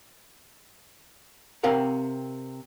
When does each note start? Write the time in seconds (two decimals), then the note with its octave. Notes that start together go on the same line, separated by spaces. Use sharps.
1.63 C3 C4 A#4 F5 F#5